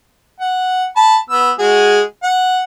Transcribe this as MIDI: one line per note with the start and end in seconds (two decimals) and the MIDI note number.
0.40 0.85 78
0.96 1.17 81
0.96 1.17 83
1.30 1.52 59
1.30 1.52 88
1.59 2.01 56
1.59 2.01 66
1.59 2.01 68
2.23 2.62 78